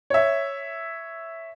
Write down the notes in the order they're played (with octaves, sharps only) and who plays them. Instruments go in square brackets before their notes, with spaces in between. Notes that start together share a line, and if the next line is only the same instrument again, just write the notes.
[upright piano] C#5 E5